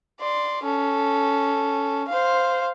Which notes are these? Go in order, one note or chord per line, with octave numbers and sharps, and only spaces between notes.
D5 C6
C#4 A4
C5 F5